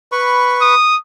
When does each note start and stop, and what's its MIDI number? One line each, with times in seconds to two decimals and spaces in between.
0.12 0.75 71
0.12 0.75 83
0.12 0.75 85
0.61 0.96 87